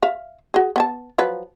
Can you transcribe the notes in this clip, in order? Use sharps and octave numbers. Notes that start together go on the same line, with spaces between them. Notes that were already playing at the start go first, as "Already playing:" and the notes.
E5 F5
F#4 G#4
B3 G#5 A5
F3 F#3 B4